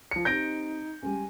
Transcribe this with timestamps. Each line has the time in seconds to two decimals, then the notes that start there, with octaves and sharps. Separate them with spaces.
0.11 F3 C#7
0.25 C4 D#4 G4 G6 A#6 D7
1.03 C#2 G3 G#5